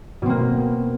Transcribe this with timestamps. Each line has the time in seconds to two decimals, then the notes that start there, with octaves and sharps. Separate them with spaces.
0.22 B2
0.26 C4
0.29 A#3